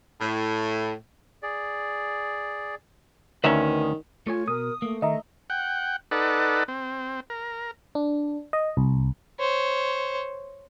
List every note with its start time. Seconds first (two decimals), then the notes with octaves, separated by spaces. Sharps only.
0.21 A2
1.43 G#4 D5
3.44 D2 D#3 C#4 B4 E5 A#5 D#6
4.27 A3 F4 C#5 G#5
4.48 B2 A#4 D#6
4.82 A3 A#3
5.02 D#3 D#5 E5 A#5
5.50 F#5 G5
6.11 D#4 A4 B4 D5 F#5
6.68 C4
7.30 A#4
7.95 D4
8.53 D#5
8.77 C2
9.39 C5 C#5